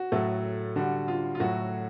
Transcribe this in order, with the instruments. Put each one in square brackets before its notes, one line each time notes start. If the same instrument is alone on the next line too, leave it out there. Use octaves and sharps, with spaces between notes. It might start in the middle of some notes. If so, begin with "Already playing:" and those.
Already playing: [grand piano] F#4
A2 F#3 A3
D3 G3 F#4
F4
F4
A2 F#3 A3 F#4